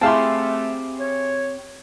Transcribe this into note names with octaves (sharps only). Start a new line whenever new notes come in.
A3 C4 E4 G4 G#4 F5 A5 C6
C#5